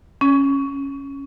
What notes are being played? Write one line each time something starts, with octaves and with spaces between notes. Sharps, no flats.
C#4